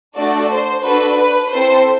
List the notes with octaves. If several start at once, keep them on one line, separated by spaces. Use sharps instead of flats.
A3 D4 F#4 A4 D5
C5
D4 F#4 A4 B4
B4
C4 E4 A4 C5